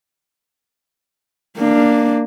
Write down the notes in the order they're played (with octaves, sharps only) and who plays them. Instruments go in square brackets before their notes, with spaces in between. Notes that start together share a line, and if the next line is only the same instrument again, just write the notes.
[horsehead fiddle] A#3 D4